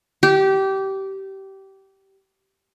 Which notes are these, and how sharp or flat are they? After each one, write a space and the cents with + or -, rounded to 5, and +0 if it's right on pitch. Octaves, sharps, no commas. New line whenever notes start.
G4 -20